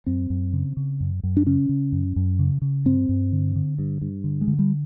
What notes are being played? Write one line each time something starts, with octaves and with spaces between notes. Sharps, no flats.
F#2 C4
F#2
C#3
C#3
F#2
F#2
D4
C#3 C#4
C#3
F#2
F#2
C#3
C#3
G2 C4
G2
D3
D3
G2
G2
D3
G#3
D3
G3